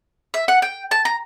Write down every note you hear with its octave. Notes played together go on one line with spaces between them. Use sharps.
E5
F#5
G5
A5
A#5